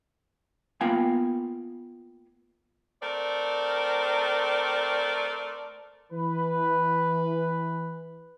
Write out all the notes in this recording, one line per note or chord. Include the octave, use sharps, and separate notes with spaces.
A#3 B3 F4 F5 G5 G#5
A3 C4 A#4 D5
E3 B4